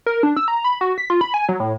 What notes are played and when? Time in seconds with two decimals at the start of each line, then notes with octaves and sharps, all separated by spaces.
0.06 A#4
0.23 D4
0.36 E6
0.48 A#5
0.64 B5
0.81 F#4
0.98 B6
1.10 F4
1.21 B5
1.34 G#5
1.49 F#3
1.60 A2